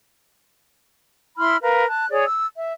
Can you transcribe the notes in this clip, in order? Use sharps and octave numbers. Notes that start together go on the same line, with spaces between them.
E4 B5 C6 F6
A#4 B4 F5
A5 F#6
G#4 C#5 D5
E6
E5